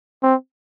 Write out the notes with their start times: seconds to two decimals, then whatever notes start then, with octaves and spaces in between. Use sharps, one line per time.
0.23 C4